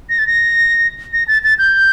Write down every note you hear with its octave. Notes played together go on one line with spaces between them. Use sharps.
A#6
A6
A#6
A#6
A6
A6
G6